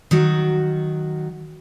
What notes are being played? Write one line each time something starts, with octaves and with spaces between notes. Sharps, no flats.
D#3 F#3 F#4